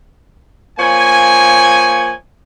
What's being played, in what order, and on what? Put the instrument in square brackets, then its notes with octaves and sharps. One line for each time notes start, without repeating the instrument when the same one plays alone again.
[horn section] F3 A#3 C#5 G#5